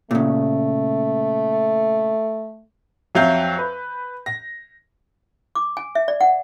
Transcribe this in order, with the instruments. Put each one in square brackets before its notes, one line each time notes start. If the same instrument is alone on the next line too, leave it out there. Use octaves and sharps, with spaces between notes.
[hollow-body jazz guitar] A#2 C#3 [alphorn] A3
[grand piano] F2 F#3 E5 F5 G6
B4
A#6
[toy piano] D6
G#5
E5
D5
F#5